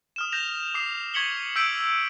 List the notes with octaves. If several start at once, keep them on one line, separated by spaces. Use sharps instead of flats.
D#6 F6 E7
G6 A#6 E7 F7
D6 D#6 C7
C#6 G#6 B6 C#7 F#7 G7
E6 G6 B6 D7 F#7